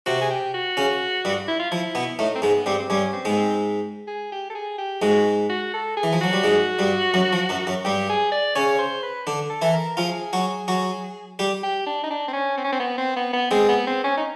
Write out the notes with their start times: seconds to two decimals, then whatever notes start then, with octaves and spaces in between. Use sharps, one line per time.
0.06 C3 C4 F#4
0.21 G#4
0.30 G4
0.54 F#4
0.77 C#3 C#4
1.25 G2 G3
1.48 E4
1.60 F4
1.71 F3 E4
1.95 B2 B3
2.19 A2 A3 D#4
2.36 C4
2.42 G#2 G#3 B3
2.66 G2 G3 C4
2.80 C4
2.90 G2 G3 C#4
3.13 C4
3.25 G#2 G#3 B3
3.37 C4
4.07 G#4
4.32 G4
4.50 A4
4.55 G#4
4.78 G4
5.02 G#2 G#3 F#4
5.50 F#4
5.74 A4
5.97 G#4
6.03 E3
6.13 F3
6.21 F#3 F#4
6.33 G3
6.44 G#2 G#3
6.79 G2 G3
7.14 F#2 F#3
7.33 F3
7.49 F#2 F#3
7.67 F#2 F#3
7.85 G2 G3 G4
8.09 G#4
8.32 D5
8.55 C#3 C#4 C#5
8.79 C5
9.03 B4
9.27 D3 D4
9.50 A4
9.62 E3 E4 A4
9.74 A#4
9.97 F3 F4 G#4
10.33 F#3 F#4
10.68 F#3 F#4
11.39 G3 G4
11.63 G4
11.87 D4
12.03 D#4
12.10 D4
12.28 C4
12.33 C#4
12.58 C4
12.64 C#4
12.72 C4
12.80 B3
12.98 C4
13.16 B3
13.33 B3
13.51 G#3 C4 G#4
13.69 B3
13.87 C4
14.04 C#4
14.17 D#4